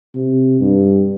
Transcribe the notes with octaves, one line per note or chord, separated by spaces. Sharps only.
C3
G2